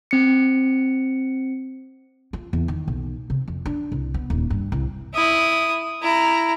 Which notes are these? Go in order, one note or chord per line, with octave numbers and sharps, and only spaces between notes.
C4 C#7
F4
E2
D#3
B1
C3
F2
D4
C2
B3
D#1
G2
C2
E4 D#6
E4 A#5